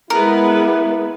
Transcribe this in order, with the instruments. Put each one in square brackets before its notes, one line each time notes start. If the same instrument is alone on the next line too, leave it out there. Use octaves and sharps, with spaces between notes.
[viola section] G#3 B3 B4 [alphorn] E4 [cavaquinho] A#4